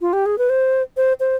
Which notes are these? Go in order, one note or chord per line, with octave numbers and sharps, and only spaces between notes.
F4
G4
G#4
B4
C5
C5
C5